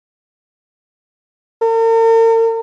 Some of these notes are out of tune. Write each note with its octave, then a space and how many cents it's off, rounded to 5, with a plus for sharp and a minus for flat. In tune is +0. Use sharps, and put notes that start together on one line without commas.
A#4 -45